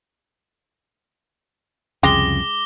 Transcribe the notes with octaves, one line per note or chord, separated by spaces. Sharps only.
C2 F2 C#3 G#3 G5 D6 A#6 G7